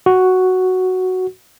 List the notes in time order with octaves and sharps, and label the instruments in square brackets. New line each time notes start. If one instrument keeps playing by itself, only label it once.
[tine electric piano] F#4